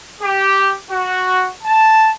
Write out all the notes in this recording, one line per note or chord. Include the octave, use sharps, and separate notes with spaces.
G4
F#4
A5